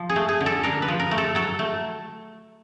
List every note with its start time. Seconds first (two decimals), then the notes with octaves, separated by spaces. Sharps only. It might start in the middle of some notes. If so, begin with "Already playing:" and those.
Already playing: F3
0.09 G#4
0.16 A3
0.29 G#4
0.41 D3
0.46 A4
0.63 D4 A#4
0.82 B4
0.88 F3
0.99 A#4
1.11 A3
1.18 A4
1.35 F#3 A4
1.59 A3